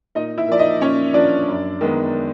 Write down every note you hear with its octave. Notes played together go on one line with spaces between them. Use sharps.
A#2 D#4 D#5
E4 E5
F3 A#3 D5
D#4 D#5
A#2 C#4 C#5
F3 A#3 D4 D5
F#2
D#3 G#3 B3